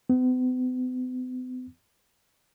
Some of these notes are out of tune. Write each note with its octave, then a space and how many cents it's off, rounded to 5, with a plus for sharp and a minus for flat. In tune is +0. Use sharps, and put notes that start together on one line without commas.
B3 +45